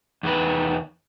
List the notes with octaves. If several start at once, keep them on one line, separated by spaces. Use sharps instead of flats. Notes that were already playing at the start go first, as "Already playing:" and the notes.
E2 D#3 B4